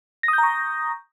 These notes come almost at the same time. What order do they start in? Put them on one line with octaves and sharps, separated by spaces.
A#6 D#6 G6 A#5 C#6